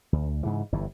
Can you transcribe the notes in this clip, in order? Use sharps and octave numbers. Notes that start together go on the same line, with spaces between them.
D2
G#2 C#3 E3
G1 G2 E3